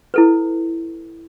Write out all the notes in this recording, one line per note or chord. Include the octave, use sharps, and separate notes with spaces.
E4 A4 B4